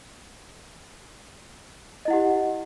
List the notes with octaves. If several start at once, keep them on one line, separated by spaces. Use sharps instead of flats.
E4 G4 D#5 F#5